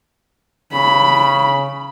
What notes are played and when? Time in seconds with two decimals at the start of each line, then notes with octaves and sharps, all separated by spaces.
0.73 C#3 B5